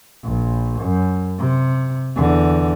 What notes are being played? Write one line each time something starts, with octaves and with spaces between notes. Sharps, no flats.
A#1
F#2
C3
E2 D3